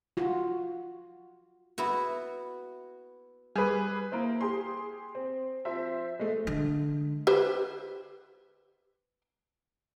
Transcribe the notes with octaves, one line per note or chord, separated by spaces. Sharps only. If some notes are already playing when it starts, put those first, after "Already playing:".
F4 F#4
B3 E4 F#4
G3 G#4 B4
A#3 E4 C5
G4 G#4 C6
C4
F3 C4 C5 E5
G#3 A3
D3 G#3
G4 B4 C5